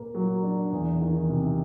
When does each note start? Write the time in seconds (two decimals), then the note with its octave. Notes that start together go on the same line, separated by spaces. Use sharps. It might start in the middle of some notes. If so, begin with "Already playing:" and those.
Already playing: A#2 A#3
0.14 F#3
0.43 D4
0.72 E2
1.01 D#3
1.29 C3